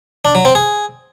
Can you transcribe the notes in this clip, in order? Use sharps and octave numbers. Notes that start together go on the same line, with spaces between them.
D4
F#3
C4
G#4